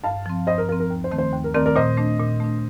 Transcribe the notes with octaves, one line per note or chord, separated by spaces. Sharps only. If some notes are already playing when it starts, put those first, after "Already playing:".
G2 F5 A5
F3 C4
G2 C5 D#5
A#4
F3 C4 A#4
A#4
D#2
C5
D#3 A3 C4
C5
D#2
A#4
D#3 A3 C4 A#4 D5
A#4 D5
A#2 C5 D#5
A3 D4
A#2
A3 D4